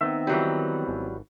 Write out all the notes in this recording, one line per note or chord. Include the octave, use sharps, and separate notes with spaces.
D#3 B3 C4 E5
E3 F#3 G3
G#1